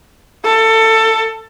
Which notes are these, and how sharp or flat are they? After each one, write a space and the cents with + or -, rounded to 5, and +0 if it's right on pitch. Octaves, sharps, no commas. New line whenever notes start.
A4 +20